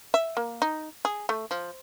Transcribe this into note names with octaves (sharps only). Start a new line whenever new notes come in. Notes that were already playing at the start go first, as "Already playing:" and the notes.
E5
A#3
D#4
G#4
A3
F3